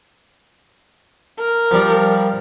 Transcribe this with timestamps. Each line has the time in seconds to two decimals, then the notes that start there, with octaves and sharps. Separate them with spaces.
1.39 A#4
1.71 F3 G3